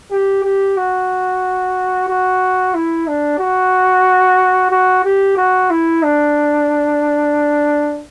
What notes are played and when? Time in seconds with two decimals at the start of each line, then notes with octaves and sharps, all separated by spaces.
0.11 G4
0.44 G4
0.77 F#4
2.09 F#4
2.75 E4
3.08 D4
3.39 F#4
4.71 F#4
5.05 G4
5.37 F#4
5.70 E4
6.03 D4